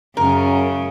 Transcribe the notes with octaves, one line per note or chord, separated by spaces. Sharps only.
F#2 C#3 A#4